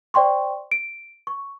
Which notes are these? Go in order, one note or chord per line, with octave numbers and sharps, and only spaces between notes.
C5 D5 G5 C6 C#6
D7
C#6